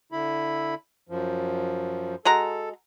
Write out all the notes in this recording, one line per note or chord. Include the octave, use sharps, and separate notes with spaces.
D3 E4 B5
F#2 F3
G#3 F#4 A4 A#5